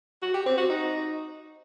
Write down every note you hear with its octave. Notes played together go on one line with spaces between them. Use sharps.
F#4
G4
C4
F#4
D#4